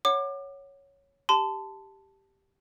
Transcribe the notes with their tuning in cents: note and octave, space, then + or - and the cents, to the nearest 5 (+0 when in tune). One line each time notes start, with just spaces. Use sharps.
C#5 +0 F#5 +0 D6 +30
G4 +0 A5 +0 C6 -30